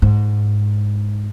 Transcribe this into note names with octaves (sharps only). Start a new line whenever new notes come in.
G#2